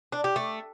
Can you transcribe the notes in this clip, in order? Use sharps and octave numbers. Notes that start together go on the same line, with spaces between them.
D4
G4
A3